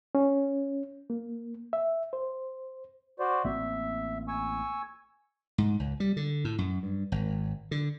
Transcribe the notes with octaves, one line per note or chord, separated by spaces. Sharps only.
C#4
A#3
E5
C5
F#4 C5 D5
A1 A#3 C4 E5
G#5 C#6 E6
G#2
C#2
G3
D3
A2
F#2
G2
G#1
D3